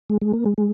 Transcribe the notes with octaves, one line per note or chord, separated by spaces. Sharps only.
G#3
G#3
A#3
G#3
G#3